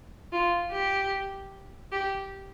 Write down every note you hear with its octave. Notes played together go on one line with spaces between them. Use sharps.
F4
G4
G4